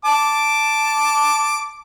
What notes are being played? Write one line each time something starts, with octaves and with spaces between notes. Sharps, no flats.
A5 D6